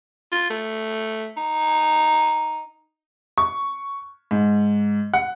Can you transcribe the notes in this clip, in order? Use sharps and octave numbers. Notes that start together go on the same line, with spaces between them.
F4
A3
D#4
C#6
G#2
F#5